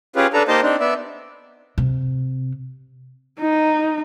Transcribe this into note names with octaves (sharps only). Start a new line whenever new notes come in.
C#4 F4 G4 G#4 B4
D4 A4 B4 A#5
A#3 D#4 G4 C5 D#5 A5
C4 D4 D#4
B3 D5 E5
C3
D#4